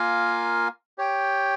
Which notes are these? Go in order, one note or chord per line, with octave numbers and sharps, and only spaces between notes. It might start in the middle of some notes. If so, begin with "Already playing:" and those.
Already playing: A#3 F4 A#4 F5 G#5
G4 C#5 G5